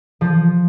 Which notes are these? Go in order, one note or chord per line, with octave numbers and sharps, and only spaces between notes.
F3